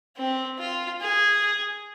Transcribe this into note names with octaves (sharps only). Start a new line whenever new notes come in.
C4
F4
G#4